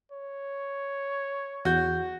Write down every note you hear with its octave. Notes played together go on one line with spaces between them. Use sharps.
C#5
E2 F#4 G6